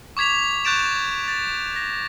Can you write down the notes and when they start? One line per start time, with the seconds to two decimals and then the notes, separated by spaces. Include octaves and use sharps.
0.17 C#6 D6 G#6 B6 F7
0.65 C#6 F#6 G6 A6 D7 E7
1.28 A6
1.76 A#6